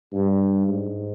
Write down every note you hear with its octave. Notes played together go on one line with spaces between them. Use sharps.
G2
G#2